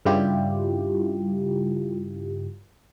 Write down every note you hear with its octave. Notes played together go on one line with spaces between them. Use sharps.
G2 C#3 G3 E4 F4 G4